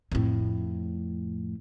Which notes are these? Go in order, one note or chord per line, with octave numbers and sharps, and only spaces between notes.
F2 A2